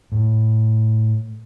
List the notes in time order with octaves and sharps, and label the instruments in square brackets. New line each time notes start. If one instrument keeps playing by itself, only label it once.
[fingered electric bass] A2